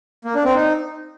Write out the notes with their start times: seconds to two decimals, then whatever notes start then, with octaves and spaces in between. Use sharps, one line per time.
0.25 A#3
0.35 D4
0.45 C4
0.55 D#4